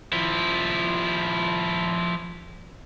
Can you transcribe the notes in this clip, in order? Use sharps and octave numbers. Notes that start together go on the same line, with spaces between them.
F3 E4